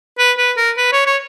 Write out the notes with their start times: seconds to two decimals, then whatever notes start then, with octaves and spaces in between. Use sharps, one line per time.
0.18 B4
0.38 B4
0.57 A#4
0.77 B4
0.92 C#5
1.06 C#5